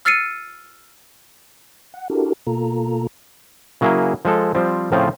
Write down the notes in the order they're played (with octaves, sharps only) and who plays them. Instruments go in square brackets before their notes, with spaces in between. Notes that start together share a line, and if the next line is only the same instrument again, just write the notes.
[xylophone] E6 F6 A6 C7 C#7 D#7
[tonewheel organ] F#5
D4 E4 F#4 G4 A4 A#4
B2 A#3 F4 A4 A#5
[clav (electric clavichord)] C#3 F#3 A#3 E4 G#4
F3 G#3 A4
F3 G3 C4
A2 C#3 F3 C4 F4